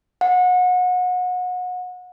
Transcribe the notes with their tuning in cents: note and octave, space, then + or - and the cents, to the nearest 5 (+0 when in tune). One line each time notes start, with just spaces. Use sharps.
F#5 -30